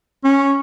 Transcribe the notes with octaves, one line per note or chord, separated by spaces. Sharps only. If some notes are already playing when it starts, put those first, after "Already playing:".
C#4